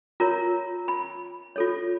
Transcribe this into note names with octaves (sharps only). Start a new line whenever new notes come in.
F4 A#4 C#5 A#5
B5
F4 A4 C#5